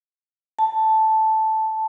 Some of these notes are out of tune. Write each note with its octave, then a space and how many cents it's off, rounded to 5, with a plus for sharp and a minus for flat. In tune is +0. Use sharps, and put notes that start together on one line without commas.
A5 -5